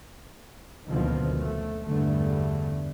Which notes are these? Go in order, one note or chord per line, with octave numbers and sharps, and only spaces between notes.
F#1 D2 B2 D3 D#3 F3
A3
E2 G2 D3 A3